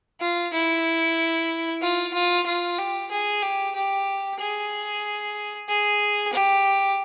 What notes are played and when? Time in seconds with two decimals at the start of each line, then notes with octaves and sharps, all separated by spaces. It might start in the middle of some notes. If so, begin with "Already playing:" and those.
0.20 F4
0.53 E4
1.82 F4
2.14 F4
2.46 F4
2.78 G4
3.11 G#4
3.42 G4
3.75 G4
4.40 G#4
5.68 G#4
6.33 G4